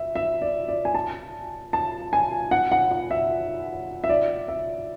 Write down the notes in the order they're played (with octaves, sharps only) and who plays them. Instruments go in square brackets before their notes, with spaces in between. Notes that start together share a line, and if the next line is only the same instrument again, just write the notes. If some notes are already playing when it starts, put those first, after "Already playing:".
Already playing: [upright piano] E5
E5
D5
D5
G#5
A5
A5
G#5
F#5
F#5
F#5
E5
E5
D5
E5